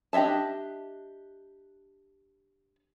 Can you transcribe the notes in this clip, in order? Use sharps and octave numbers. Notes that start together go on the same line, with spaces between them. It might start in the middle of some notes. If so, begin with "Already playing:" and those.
D4 G4 D#5 E5 A5